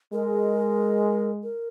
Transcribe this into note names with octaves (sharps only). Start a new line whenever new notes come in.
G#3 A#4
A#4